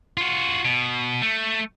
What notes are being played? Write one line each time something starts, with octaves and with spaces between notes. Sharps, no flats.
F4 F#4
B2
A3